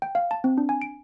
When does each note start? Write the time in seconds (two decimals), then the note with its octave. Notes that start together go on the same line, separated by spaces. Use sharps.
0.02 G5
0.15 F5
0.31 A5
0.44 C4
0.58 D4
0.69 G#5
0.82 D7